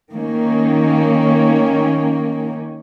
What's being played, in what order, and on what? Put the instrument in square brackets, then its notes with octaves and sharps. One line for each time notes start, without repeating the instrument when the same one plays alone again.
[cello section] D#3 A#3 C#4